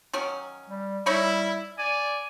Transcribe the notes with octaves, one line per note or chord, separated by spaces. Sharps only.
D#3 F#3 C#4
G3
G3 D#4 E4 C#5 B5
D5 G#5